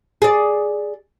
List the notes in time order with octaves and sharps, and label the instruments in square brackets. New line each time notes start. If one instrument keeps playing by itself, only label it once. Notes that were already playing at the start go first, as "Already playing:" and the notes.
[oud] G#4 D5